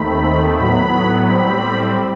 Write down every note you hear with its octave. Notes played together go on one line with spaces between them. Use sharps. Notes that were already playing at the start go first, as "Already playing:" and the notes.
Already playing: D#2 D#3 A3 C4 B5
A2 F#3 B3 B5
A2 G3 C4 B5